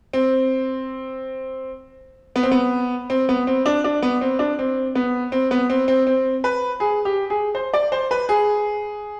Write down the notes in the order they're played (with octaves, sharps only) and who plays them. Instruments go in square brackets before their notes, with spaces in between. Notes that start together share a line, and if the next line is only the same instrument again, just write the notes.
[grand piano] C4
B3
C4
B3
C4
B3
C4
D4
D4
B3
C4
D4
C4
B3
C4
B3
C4
C4
C4
B4
G#4
G4
G#4
C5
D5
C5
B4
G#4